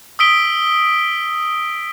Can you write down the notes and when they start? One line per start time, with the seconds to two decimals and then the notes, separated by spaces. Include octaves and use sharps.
0.19 D#6 E6 B6 D7 G7